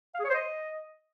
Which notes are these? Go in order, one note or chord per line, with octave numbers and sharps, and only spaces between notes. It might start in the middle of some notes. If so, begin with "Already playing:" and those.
F5
G#4
C#5
C5
D#5